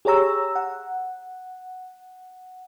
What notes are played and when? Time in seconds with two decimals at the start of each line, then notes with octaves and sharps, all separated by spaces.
0.05 G4 G#4 C#5 A#5 E6
0.55 F#5